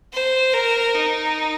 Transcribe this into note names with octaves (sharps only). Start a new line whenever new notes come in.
C5
A#4
D#4